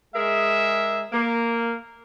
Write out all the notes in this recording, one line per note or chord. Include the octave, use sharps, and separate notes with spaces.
G#3 G#4 A#4 E5
A#3